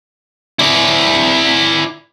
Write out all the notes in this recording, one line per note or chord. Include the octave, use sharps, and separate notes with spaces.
E4 D5